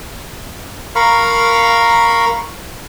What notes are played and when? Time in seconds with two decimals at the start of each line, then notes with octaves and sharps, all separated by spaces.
0.96 A#4 F5 B5 C#6